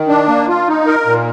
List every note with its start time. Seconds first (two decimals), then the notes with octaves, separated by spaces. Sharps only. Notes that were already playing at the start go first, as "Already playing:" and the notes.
Already playing: D#3
0.08 D4
0.28 A#3
0.48 F4
0.68 D#4
0.87 A#4
1.06 A#2